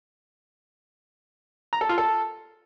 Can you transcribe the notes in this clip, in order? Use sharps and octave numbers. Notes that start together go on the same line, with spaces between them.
A#5
A4
F4
A4